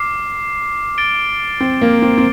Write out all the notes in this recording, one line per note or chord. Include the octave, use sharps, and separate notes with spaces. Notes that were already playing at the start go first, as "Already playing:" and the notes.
Already playing: D6 F6 C7
A6 D7 G7
C4
A#3
C4
C4